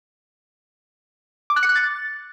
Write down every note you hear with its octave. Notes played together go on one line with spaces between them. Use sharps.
D6
F#6
C#7
F#6
A6